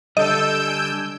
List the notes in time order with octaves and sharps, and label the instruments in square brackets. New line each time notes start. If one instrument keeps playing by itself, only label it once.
[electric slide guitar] D3 G3 [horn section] A4 [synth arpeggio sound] D#5 [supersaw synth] E6 G6 D7
[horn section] D4 G#5